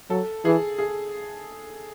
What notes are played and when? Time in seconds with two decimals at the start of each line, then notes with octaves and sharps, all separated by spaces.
0.10 F#3 A4
0.45 E3 G#4
0.78 G#4